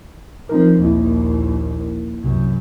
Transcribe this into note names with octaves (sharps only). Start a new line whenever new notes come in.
F3 C4 D#4 A#4
A#1 D#2 A#3 E4
C2 F#2 C3